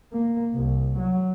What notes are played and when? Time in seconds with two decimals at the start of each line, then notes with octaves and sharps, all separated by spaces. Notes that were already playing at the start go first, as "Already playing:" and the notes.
0.12 A#3
0.54 C2
0.98 F#3